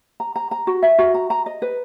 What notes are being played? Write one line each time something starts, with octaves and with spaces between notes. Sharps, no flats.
A#5
A#5
A#5
F#4
E5
F#4
A#5
A#5
D#5
B4